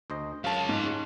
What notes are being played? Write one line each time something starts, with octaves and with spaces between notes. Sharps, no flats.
D2 C5 D#5
F#2 G#3 C#5 F5 A5
G#2 C#4